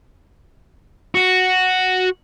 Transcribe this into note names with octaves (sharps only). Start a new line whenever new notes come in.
F#4